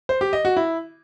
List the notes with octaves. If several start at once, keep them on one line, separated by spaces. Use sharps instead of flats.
C5
G4
D#5
F#4
E4